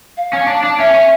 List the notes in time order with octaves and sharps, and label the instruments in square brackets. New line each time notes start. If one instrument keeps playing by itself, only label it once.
[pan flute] F5
[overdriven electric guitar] C#4
D4
D4
[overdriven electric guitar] C#4 [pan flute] E5
[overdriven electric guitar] C#4